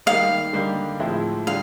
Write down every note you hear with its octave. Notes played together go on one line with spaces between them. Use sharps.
D#3 G3 A#3 D#4 F5
D3 G3 A#3 D#4
A2 F3 G#3 C4 E4
D3 G3 F5